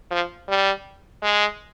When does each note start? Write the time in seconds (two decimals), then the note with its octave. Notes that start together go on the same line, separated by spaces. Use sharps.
0.11 F3
0.49 G3
1.23 G#3